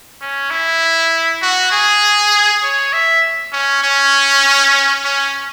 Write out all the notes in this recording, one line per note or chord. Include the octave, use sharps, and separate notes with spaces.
C#4
E4
F#4
G#4
C#5
E5
C#4
C#4
C#4